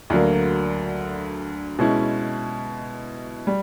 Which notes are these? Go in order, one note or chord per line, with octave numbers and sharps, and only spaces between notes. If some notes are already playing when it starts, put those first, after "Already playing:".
D2 D3 F#3 A#3
B2 G#3 C#4 E4
G3